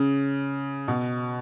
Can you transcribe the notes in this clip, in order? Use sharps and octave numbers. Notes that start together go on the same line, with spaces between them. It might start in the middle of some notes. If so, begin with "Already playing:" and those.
Already playing: C#3
B2